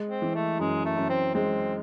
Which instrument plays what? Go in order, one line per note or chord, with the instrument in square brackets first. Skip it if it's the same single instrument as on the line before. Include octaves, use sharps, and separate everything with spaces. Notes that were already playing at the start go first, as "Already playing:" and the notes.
Already playing: [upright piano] G#3
[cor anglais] C4
[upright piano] E3
[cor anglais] A3
[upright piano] F#2 [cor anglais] G#3
[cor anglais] A3
[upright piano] F#2
[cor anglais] C4
[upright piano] G#3 [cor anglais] C4